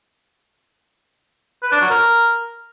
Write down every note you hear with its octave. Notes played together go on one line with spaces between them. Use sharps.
B4
D4
F#3
A#4